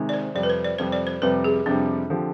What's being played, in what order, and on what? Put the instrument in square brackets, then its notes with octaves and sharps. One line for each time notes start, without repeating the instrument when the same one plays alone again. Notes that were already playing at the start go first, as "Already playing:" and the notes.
Already playing: [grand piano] C3 D#3 G#3
[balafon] D5
C5
[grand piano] F2 C3 G3 [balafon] D5
[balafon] B4
C5
D5
[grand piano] F2 C3 G3 [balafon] C5
[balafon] D5
C5
[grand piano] F2 C3 G3 [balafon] B4
[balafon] G#4
[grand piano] F2 C3 G3 [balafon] D4
[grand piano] D3 F3 C4 G4